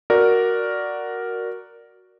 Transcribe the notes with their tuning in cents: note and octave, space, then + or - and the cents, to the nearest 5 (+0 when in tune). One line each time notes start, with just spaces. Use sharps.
F#4 +0 A#4 +0 D5 +0